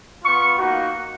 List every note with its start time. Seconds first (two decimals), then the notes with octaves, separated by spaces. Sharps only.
0.23 B3 F4 C#6
0.57 A#3 D#4 F#4